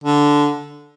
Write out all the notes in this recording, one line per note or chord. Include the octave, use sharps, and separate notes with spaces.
D3